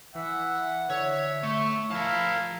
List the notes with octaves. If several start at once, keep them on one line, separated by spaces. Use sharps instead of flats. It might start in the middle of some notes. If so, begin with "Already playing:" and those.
E3 E5 F#5
D3 C#5 E5
A3 C#6
F3 E4 A#4 F5 A5